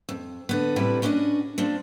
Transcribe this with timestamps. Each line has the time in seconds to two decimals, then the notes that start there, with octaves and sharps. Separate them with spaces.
0.09 F2
0.49 D3 B3
0.76 A2 C3 G3 E4 B4
1.02 C#4 D4 E4 F#4 D#5
1.58 F3 C4 D4